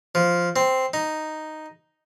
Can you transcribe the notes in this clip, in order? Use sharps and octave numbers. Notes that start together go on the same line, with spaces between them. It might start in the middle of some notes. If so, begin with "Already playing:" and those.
F3
C4
D#4